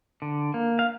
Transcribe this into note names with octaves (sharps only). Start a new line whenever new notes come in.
D3
A#3
F5